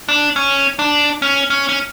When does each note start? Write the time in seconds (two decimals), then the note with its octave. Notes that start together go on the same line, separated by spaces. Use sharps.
0.09 D4
0.36 C#4
0.79 D4
1.22 C#4
1.50 C#4
1.69 C#4